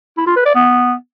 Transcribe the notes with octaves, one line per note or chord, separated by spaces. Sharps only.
E4
F4
B4
D5
B3